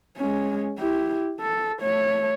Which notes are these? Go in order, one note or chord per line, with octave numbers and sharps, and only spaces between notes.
G#3 C#4
E4 G4
A4
A3 C#5